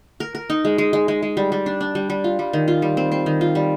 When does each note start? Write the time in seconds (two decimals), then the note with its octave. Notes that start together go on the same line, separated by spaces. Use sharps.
0.20 A#4
0.35 A#4
0.50 D#4
0.65 G#3
0.78 G#3
0.93 G#3
1.08 G#3
1.23 G#3
1.37 G3
1.52 G3
1.66 D4
1.81 D4
1.95 G3
2.10 G3
2.24 F4
2.39 G3
2.53 D#3
2.68 F4
2.82 G3
2.97 C4
3.12 C4
3.26 D#3
3.41 F4
3.55 G3